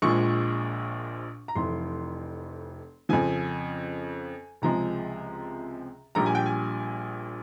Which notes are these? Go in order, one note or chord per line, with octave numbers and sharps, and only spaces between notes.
A#1 A#2 F3 G#3 C#6
A#5
F1 F2 E3 C6
F2 C#3 F3 G#5
C#2 C3 F3 G#3 A#5
A#1 A#2 G3 A#5
G#5
G5
G#5